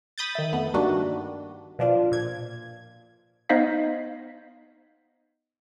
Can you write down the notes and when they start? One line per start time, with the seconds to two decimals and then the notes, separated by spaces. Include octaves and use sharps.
0.18 B5 D#6 G6 A6
0.35 D#3 E5
0.53 F2 A3 B3
0.74 G2 D#3 G3 A#3 D4 F#4
1.79 B2 F3 D4 F4
2.11 A#2 G#6
3.49 B3 D#4 C5 D#5 F5 B6